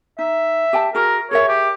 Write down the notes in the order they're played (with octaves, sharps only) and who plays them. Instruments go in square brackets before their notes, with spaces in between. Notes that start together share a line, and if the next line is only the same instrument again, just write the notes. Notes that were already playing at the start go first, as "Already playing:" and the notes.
[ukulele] D#4 [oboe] E5
[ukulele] G4 G5 A5
[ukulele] F#4 G#4 [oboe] A#4
[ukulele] G#4 A#4 E5 [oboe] C#5
[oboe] G4